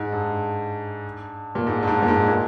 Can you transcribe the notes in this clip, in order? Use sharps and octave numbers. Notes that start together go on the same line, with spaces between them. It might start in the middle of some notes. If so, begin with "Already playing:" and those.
Already playing: G#2
G2
A#2
G#2
G2
G#2
A#2
G#2
A#2